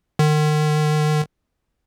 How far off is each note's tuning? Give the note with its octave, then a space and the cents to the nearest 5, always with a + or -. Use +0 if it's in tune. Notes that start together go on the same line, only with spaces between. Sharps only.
D#3 -40